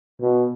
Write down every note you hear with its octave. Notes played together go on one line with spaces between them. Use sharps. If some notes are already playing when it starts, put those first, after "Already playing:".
B2